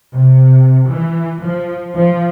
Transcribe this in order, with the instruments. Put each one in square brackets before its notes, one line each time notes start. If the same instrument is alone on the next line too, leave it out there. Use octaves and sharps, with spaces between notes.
[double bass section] C3
E3
F3
F3